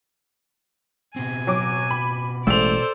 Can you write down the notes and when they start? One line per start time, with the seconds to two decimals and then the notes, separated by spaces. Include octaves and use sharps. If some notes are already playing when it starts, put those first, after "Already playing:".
1.16 B2 C4 G#5
1.47 F#3 D6
1.91 B5
2.47 A1 G#3 A3 A4 C5 D5 E6 F7